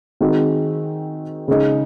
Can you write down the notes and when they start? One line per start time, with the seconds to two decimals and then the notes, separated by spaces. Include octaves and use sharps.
0.21 D#3 G#3 C4 D#4 F#4
1.48 C#3 G#3 D#4